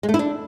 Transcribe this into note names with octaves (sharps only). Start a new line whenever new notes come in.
G#3
A3
E4
D4